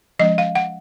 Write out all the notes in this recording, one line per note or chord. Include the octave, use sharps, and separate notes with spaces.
F3 G#3 C#4 D#5
F5
F#5